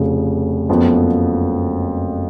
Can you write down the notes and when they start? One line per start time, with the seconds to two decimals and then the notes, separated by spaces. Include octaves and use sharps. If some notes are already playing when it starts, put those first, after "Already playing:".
Already playing: F1 F2 C#3
0.69 F#1 F2 F3 B3